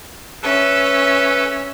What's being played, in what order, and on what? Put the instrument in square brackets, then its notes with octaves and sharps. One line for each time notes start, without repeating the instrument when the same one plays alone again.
[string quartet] C#4 E5 [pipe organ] A4 B4